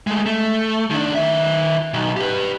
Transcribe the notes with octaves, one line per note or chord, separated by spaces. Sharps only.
G#3 A3
A3
D#3 D4
D#3 E5
B1
G4 B4